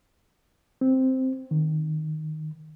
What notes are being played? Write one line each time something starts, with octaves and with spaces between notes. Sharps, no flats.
C4
D#3